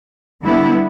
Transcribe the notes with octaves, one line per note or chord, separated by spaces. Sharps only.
D3 G3 B3 E4